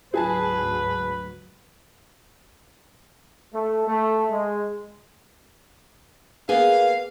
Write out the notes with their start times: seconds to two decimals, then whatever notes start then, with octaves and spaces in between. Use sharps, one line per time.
0.14 D2 G#2 F#3 G#4 B4 G#5 A5
3.54 A3
3.87 A3
4.30 G#3
6.49 A#3 B3 G#4 F5